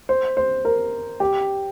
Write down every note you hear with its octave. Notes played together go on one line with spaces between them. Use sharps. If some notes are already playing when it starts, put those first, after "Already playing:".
C5
C5
A#4
G4